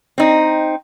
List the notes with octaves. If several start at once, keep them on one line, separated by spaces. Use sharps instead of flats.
C4 D#4